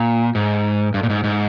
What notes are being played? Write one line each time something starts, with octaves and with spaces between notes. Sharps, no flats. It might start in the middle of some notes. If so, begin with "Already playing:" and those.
Already playing: A#2
G#2
G2
A#2
G#2
G#2